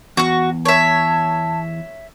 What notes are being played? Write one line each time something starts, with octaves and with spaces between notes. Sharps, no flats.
E2 F#4 C#6
C#5 E5 A5